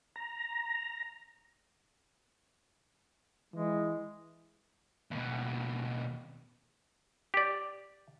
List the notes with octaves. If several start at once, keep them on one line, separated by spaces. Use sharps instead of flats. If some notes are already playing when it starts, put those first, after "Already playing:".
A#5
E3 G#3
D#2 B2
G4 D5